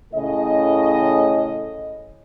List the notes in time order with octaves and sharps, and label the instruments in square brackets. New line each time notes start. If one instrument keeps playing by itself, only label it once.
[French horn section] A2 C#3 A4 D#5